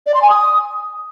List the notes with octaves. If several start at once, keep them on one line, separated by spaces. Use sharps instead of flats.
D5
C6
G#5
D#6